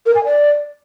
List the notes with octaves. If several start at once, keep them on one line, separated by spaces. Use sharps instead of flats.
A#4
G#5
D5